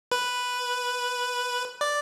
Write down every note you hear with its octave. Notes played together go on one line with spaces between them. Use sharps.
B4
D5